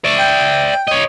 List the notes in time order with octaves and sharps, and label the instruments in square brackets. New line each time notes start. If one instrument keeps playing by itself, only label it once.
[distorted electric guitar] D5 E5 [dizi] C#6
[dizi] G5
[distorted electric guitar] C#5 D#5